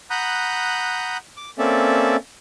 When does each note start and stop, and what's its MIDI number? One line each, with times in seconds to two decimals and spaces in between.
0.10 1.17 78
0.10 1.17 82
0.10 1.17 83
0.10 1.17 87
0.10 1.17 90
0.10 1.17 91
1.37 1.50 86
1.58 2.16 58
1.58 2.16 60
1.58 2.16 61
1.58 2.16 69
1.58 2.16 74
1.58 2.16 76